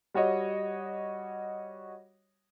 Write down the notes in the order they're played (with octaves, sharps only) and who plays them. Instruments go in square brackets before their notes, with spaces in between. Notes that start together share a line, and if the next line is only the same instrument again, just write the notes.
[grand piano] G3 F#4 C#5 D#5